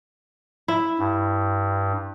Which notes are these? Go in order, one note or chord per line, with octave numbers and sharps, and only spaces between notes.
E4
G2